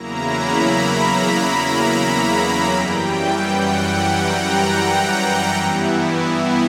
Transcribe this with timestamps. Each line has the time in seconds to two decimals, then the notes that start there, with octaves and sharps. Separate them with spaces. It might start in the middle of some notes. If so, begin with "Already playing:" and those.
Already playing: E2 C#3 F#3 A#3 E4 A#5
0.25 B5
0.60 A#5
2.71 F#2 E3 G3 G5
3.42 F#5
4.13 A#5
5.54 G2 E3 B3 E4